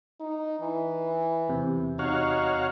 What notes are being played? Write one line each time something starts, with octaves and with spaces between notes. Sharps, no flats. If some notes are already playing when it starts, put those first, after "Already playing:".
D#4
E3
E2 C3
D#4 F#4 C#5 F5